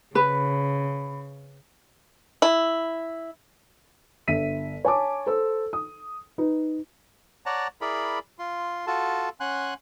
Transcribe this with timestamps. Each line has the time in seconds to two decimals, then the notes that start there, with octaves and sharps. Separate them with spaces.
0.15 C#3 B4 B5
2.42 E4
4.28 G1 E5 B6 D#7
4.85 C#5 G#5 A5 D6
5.26 A4 C5 E6
5.73 D#6
6.38 D#4 B4
7.46 C#5 D5 F#5 A5 A#5
7.81 E4 G#4 A#4 D5 B5
8.39 F4 C6
8.87 F4 F#4 A4 A5
9.40 C#4 F#5 G#5 C6 F#6